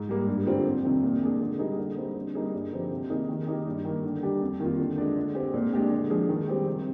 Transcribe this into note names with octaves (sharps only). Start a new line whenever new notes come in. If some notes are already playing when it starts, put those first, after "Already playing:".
Already playing: G#2
G3 A#3
G2
D3 G3 C4 F4
F2
C3 D#3
A#2
G#3 D4 G#4
D3
G3 A#3 D#4 G#4
D3
G3 C4
D3
G3 A#3 D#4 G#4
G2
D3 F3 C4 G4
C3
D#3 A#3 D#4 G#4
D#3
A#3 D#4 G4
G2
D#3 A#3
D3
G3 D4 G4
F2
D#3 A#3 F4
D3
G#3 D4
D3
G#3 C4 G4
A#2
G#3 D4 G4
D3
F3 G#3 D4 G#4
D#3
G3 C4 G4
C3